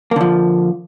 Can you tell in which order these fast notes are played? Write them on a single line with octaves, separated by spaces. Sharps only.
A#3 D3 F3